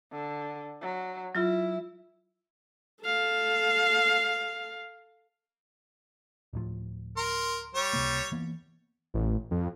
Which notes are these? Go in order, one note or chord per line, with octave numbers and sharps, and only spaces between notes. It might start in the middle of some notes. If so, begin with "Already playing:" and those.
D3
F#3
F#3 E4 F4
A4 F5
D1 A2 F3
A#4 C6
G3 C#5
C#2 C3 A#3
E3 A#3 B3
A1
F2